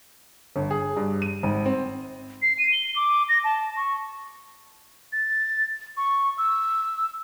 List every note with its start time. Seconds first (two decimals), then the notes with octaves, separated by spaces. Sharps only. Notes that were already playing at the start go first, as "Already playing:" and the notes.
0.56 G1
0.71 G#4
0.97 G2
1.22 D#7
1.43 G#1
1.66 C4
2.42 C7
2.58 D#7
2.72 G7
2.96 D6
3.29 A#6
3.44 A5
3.76 C#6
5.12 A6
5.97 C#6
6.38 E6